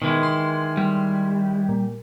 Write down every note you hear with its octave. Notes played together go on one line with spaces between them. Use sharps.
B2 D#3 E3 G#3
C6
G3
A#2